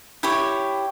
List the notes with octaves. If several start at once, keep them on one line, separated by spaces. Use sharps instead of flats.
E4 G4 C#5